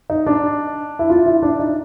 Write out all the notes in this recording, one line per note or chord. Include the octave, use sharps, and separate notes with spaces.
D#4
D4
E4
F4
E4
D4
D#4